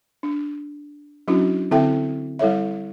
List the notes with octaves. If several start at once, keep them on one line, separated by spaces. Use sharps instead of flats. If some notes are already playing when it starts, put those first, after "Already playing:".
D4
F#3 C#4 D4 E4 F#4
D3 C4 E4 A4 E5 G5
G3 E4 A4 C#5 E5